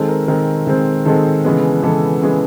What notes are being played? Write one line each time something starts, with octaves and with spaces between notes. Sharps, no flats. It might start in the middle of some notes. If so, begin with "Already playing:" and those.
Already playing: D#3 G#3 C4 A4
A#4
D#3 G#3 C4 A#4
D#3 G#3 C4
D#3 G#3 C4 A4
C#3 E3 G#3 B3
C#3 E3 G#3 B3 A4
C#3 E3 G#3 B3